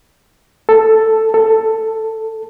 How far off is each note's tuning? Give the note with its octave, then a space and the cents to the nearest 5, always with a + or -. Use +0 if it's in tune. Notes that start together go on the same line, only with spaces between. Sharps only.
A4 +5
A4 +10